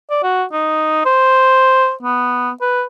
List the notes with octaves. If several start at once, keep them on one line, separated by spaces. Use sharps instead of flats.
D5
F#4
D#4
C5
B3
B4